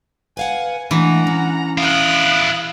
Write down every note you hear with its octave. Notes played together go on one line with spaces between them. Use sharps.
B4 F5 F#5 G#5
E3 G#3 A3 D4 F#5 A#5
C#4
E4 F5 D#6 F#6